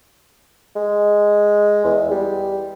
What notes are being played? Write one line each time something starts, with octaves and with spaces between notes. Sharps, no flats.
G#3
E2
G3